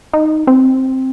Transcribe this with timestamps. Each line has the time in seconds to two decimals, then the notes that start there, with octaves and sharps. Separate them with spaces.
0.13 D#4
0.47 C4